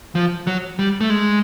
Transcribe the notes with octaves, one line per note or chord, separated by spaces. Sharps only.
F3
F#3
G3
A3
G#3